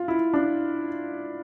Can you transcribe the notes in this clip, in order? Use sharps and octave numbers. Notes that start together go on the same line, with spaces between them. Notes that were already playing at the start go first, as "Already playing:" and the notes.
Already playing: F4
E4
D4